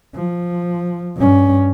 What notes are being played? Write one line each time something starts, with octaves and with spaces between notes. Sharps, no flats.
F3
G2 C#4